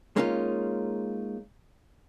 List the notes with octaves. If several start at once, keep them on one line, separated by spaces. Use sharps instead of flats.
G#3 A#3 C#4 D#4 F4